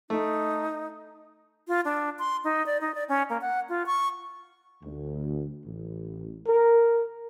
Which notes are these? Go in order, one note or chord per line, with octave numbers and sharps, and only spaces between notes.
A3 D#4
F4
D4
C6
D#4
D5
D#4
D5
C#4
A#3
F#5
F4
C#6
D2
A1
A#4